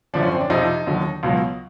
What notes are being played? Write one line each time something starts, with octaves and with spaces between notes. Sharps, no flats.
F#2 D3 F3 D4
C#4
C4
D4
F2 C3 F3 D#4
D#2 D3 F#3
C#2 B2 F#3